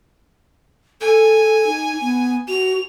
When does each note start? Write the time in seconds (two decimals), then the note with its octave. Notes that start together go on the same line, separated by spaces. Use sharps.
1.01 A4 G#5
1.66 D#4
2.01 B3
2.48 F#4 F7